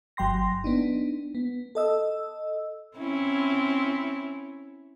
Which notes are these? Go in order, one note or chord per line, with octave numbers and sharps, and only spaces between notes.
G1 F#3 G5 C6 A#6
B3 D4 D#4
B3
A4 D#5 E6
C4 C#4 E4